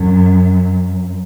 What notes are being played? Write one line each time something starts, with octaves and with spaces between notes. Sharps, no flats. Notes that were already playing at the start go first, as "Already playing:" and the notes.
Already playing: F#2